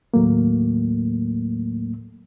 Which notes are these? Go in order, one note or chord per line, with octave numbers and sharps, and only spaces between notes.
D#2 A2 F#3 A3 A#3